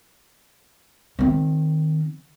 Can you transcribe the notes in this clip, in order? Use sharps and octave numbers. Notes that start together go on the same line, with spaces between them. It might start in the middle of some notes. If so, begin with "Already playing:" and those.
D#3 C4